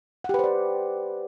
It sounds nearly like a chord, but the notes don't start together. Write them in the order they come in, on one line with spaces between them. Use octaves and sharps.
F#5 G4 B4 C5 D5